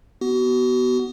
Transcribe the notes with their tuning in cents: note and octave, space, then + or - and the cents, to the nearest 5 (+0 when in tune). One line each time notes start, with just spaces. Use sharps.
B3 +0 F#4 +35